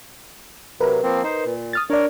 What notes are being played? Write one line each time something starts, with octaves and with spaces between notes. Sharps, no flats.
C3 F#3 A#4 B4
F3 A#3 C4
D#4 C5
A#2
D#6 F6 A6
D4 A#4 C#5 D5